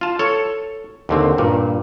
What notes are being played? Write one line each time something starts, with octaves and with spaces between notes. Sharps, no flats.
F4 A5
A4 C#5
D#2 D3 C4
G2 A#2